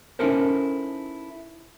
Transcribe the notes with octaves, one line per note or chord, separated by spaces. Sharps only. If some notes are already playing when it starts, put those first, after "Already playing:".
C#4 D#4 E4 A4 A#4 C5